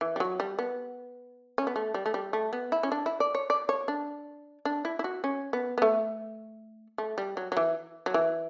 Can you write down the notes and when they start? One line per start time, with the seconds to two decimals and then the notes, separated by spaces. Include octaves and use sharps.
0.01 E3
0.16 G3
0.20 F#3
0.40 G3
0.59 B3
1.58 C#4
1.67 B3
1.76 A3
1.94 G3
2.06 A3
2.14 G3
2.33 A3
2.53 B3
2.72 E4
2.83 C#4
2.92 D4
3.06 E4
3.20 D5
3.35 C#5
3.50 D5
3.69 C#5
3.88 D4
4.65 D4
4.85 E4
4.99 E4
5.04 F#4
5.24 C#4
5.53 B3
5.78 B3
5.82 A3
6.98 A3
7.18 G3
7.37 F#3
7.52 F#3
7.57 E3
8.06 F#3
8.14 E3